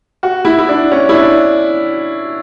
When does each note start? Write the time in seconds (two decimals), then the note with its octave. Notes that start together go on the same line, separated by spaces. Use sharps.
0.23 F#4
0.45 E4
0.58 E4
0.69 D4
0.92 C#4
1.09 E4
1.13 D4